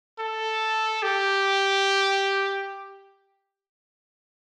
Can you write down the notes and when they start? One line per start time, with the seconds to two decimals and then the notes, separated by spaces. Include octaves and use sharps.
0.19 A4
1.03 G4